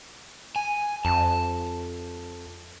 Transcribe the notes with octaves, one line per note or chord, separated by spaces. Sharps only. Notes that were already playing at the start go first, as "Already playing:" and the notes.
G#5
F2 A5